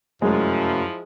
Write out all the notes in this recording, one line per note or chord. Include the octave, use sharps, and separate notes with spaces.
F1 F#2 F3 F#3 G#3 A3 E4